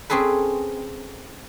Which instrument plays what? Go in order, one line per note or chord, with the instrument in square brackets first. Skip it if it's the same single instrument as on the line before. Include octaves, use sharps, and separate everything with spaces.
[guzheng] C4 C#4 G#4 A4 B4